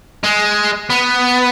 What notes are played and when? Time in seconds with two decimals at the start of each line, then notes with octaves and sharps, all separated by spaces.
0.24 G#3
0.90 B3